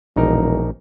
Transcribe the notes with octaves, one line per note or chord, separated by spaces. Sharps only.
E1 A#1 D#4 A#4